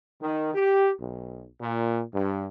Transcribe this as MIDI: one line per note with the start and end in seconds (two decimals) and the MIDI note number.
0.21 0.52 51
0.54 0.91 67
1.00 1.45 35
1.61 2.02 46
2.13 2.47 43